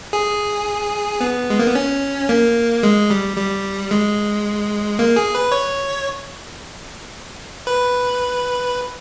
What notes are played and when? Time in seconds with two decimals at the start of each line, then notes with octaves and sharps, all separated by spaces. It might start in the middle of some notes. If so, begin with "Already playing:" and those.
0.13 G#4
1.21 B3
1.50 G#3
1.59 A#3
1.67 B3
1.75 C#4
2.29 A#3
2.83 G#3
3.10 G3
3.37 G3
3.91 G#3
4.99 A#3
5.16 G#4
5.35 B4
5.52 C#5
7.67 B4